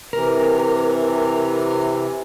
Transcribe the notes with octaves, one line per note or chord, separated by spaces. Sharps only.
C3 E3 A#4